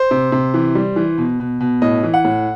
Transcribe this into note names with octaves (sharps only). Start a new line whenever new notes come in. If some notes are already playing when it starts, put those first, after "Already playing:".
Already playing: C5
C3
C3
E3
G3
E3
B2
B2
B2
A2 D#5
E3
F#5
A2